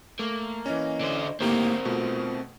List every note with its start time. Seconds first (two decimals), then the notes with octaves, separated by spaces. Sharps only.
0.19 A3 A#3
0.66 E3 C#4 D#5
1.00 D3 C5
1.40 A2 D#3 A#3 C4 G4 A#4
1.85 B2 A3 F4